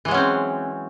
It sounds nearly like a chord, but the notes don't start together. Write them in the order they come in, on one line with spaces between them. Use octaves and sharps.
E3 G#3 F#3 C#4 C4